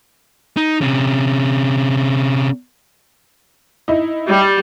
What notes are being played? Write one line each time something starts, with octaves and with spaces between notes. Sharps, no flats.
D#4
C3 C#4
D#4 E4
G3